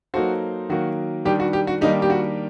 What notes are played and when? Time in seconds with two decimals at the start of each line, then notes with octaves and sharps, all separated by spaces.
0.14 F#3 A#3 D#4 F#4 A4 C5
0.69 D#3 F#3 A#3 F#4
1.25 D#3 G3 D4 G4
1.40 F#4
1.53 G4
1.67 F#4
1.81 D#3 G3 A#3 D4 D#4 G4
2.02 G4
2.10 F#4